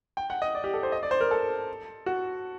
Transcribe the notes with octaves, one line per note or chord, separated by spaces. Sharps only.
G5
F#5
D#5
D5
G4
A4
C5
D#5
D5
C5
A#4
A4
F#4